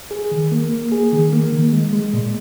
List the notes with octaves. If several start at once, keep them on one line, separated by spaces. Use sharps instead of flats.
G#4
D#3
A#3
A#3
G#4
D#3
A#3
D#3
G#3
G#3
A#2